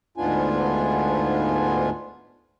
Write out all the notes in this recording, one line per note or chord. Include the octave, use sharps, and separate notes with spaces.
D2 G#2 B3 D4 F4 G#5